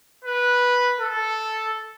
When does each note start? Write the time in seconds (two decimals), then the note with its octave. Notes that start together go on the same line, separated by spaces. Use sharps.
0.24 B4
1.00 A4